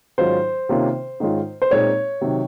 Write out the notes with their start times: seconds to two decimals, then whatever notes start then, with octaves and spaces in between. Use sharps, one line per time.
0.18 G#2 D#3 F#3 C#4 F4 C5
0.69 C3 D#3 A#3 C#4 F4
1.20 G#2 D#3 G#3 C#4 F4
1.62 C5
1.71 A#2 G#3 C4 D#4 C#5
2.21 C3 D#3 F#3